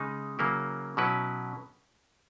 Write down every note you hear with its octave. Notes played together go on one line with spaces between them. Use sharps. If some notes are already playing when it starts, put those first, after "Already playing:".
Already playing: C#3 G#3 D#4
C#3 F#3 A#3 E4
B2 F#3 C#4 E4 B4